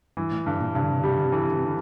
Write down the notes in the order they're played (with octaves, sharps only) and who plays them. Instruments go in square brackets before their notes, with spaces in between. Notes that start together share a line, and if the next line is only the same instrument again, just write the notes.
[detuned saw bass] G2 [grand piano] E3
[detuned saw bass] A2
[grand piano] G2 [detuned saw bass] D3
[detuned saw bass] A#2
[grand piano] G2 [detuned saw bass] C3
[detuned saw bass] D3
C3
D3
[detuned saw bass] C3 [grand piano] G3
[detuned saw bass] D3
C3
[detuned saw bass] D3 [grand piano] E3
[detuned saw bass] C3
D3
C3
D3